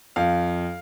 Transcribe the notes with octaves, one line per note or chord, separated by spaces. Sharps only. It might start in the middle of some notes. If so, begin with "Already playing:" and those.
F2 F5